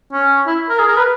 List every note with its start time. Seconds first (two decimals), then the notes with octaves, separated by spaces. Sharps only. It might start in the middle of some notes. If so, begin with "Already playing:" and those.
0.12 C#4
0.47 E4
0.69 A#4
0.79 G#4
0.88 A#4
0.97 B4